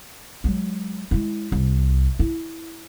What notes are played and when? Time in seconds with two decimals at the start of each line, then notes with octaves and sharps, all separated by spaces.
0.44 F#3 G#3
1.11 G#3 E4
1.52 C2
2.19 E4